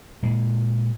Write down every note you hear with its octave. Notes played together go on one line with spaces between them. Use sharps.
A#2 G#3